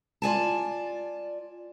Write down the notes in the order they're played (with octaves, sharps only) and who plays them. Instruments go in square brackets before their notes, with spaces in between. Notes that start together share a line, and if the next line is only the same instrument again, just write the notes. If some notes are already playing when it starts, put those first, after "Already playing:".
[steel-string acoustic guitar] F4 D5 G#5 A5